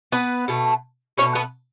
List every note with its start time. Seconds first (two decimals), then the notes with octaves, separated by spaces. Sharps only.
0.12 B3 B4
0.48 B2 A3
1.18 B2 A3 C#4 C#5
1.35 B3 B4